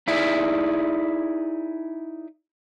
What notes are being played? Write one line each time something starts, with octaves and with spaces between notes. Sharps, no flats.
D#4 E4 G#4 D5 E5